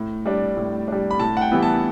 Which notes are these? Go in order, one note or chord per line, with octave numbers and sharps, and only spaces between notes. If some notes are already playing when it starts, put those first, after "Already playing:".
Already playing: A2
G3 D4
A2
G3 D4
B5
A2 A5
F#5
G5
E3 G3 B3 E4
A5